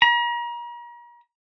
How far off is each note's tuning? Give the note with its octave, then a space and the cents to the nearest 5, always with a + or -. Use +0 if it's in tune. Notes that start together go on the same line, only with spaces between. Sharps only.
A#5 +40